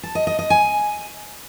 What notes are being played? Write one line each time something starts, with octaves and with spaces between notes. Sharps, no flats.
A5
D#5
D#5
D#5
G#5